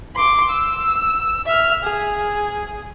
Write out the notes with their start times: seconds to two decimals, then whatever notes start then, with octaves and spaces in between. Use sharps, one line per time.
0.16 C6 D6
0.49 E6
1.46 E5 F6
1.84 G#4